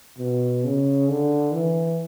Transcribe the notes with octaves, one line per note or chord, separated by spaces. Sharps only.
B2
C#3
D3
E3